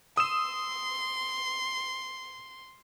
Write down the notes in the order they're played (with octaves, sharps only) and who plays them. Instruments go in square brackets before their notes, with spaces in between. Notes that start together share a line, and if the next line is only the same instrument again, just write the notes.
[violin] C6 [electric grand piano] D#6 E6 E7